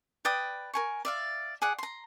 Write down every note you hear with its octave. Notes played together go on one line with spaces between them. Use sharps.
B4 D5 G5 D#6
A#4 G#5 C#6
D5 E5 F5
G#4 D5 F#5
A#5 C6